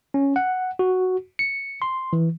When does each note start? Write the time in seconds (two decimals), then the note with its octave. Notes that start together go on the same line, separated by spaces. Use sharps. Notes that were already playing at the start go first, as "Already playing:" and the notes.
0.14 C#4
0.36 F#5
0.79 F#4
1.39 C#7
1.82 C6
2.13 E3